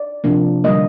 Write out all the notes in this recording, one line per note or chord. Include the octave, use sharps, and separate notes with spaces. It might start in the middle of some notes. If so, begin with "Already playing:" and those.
Already playing: D5
C3 F3 A#3 D4
D3 G3 A#3 D#5